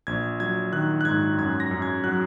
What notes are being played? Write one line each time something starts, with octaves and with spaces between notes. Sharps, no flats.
A#1 G#6
F#3 G#6
D#3 F#6
F#6
G#2 G#6
F#2 G#6
A#6
F#2
G#6
F#3 F#6